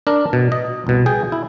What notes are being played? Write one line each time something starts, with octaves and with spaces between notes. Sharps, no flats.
D4 A#4
B2
D#5
C2 B2
G#4 G5
E4